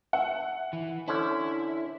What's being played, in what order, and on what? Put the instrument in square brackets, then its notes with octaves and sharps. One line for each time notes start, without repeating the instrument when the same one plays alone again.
[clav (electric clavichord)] E5 [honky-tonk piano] F#5
[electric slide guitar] E3
[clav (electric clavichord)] D3 C#4 C5 [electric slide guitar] E4